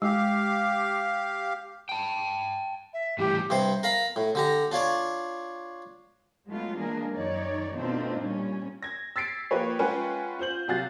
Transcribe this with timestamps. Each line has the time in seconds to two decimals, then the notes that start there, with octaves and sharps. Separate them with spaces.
0.02 G#3 G4 F5
1.89 G5 A5
2.93 E5
3.19 A2 E3 G3 G4
3.50 G2 C3 C5
3.83 A#4 F5 A#5 B5
4.16 A2
4.35 D3 G4 A#5
4.72 D4 F4 C#5 D5
6.47 F#3 G#3 A3 B3 F4
6.76 E3 G#3 A#3 D4 G#4 A#4
7.14 F#2 D#3 D#4 C#5 D5
7.75 B2 A3 C4 D4 D#4 F4
8.18 A#2 G3 C#4
8.83 G#6 A#6
9.16 E6 A6 B6 C7 D7
9.51 F3 A#3 G4 B4 C#5
9.79 G#3 C#4 F4 B4 F#5 G5
10.39 F4 C5 G6 F#7
10.68 C3 F#3 F#4 F5 F#6 A6